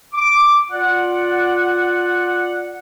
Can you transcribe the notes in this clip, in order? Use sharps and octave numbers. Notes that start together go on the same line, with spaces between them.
D6
F4 D5 F#5